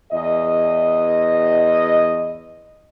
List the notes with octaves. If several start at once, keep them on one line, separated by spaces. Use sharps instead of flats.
E2 D#5